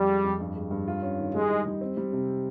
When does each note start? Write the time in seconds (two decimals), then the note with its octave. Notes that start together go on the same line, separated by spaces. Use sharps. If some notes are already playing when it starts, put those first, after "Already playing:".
Already playing: F2 G3
0.08 G#3
0.24 F2
0.40 G2
0.56 G#3
0.71 G2
0.88 F4
1.02 C#4
1.19 D#3
1.34 G3 G#3
1.50 D#4
1.66 G3
1.81 C4
1.97 G3
2.13 C3